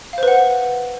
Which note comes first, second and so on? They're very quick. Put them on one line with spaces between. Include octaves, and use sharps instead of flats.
F5 C5 B4 F#5